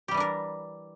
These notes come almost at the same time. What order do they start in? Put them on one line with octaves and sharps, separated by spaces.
G4 G3 E3 D4 A#4